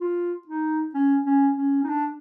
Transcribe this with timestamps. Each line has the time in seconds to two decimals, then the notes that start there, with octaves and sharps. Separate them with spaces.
0.01 F4
0.47 D#4
0.94 C#4
1.26 C#4
1.57 C#4
1.83 D#4
1.88 D4